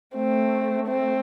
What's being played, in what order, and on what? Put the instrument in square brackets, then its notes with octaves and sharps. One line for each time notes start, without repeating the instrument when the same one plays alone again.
[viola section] A3 [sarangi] C4
[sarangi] C4